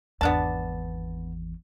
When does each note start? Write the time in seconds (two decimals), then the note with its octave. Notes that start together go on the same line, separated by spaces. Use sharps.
0.21 G#1 E2 B3 D4 A5